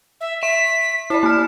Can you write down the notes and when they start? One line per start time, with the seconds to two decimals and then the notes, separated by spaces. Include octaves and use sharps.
0.21 E5
0.41 E5 B6 E7
1.10 E4 D5 A5
1.23 A#3 F6